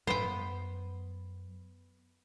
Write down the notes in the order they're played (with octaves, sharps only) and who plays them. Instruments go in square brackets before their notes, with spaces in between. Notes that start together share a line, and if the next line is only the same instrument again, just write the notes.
[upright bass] F#2 [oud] B3 [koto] C5 G5